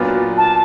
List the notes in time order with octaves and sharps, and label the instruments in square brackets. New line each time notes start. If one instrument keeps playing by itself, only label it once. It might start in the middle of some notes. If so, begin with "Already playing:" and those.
Already playing: [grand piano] A#2 F#3 B3 D4 F4
[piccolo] A5